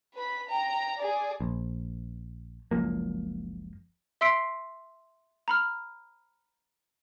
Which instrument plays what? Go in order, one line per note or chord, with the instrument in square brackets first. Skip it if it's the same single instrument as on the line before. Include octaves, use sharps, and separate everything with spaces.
[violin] B4 B5
G5 A#5
G#4 D5
[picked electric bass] A#1
F#1 C#2 F3 A#3
[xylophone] E5 C6 E6 B6 C7 D7
A#5 B5 F6